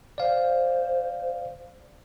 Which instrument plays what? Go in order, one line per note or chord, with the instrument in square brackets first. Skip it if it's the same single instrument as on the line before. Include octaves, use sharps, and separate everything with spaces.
[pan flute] C5 [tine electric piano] D5 F5